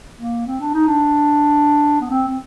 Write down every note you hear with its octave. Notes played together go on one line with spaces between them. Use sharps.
A#3
C4
D4
D#4
D4
B3
C4
C4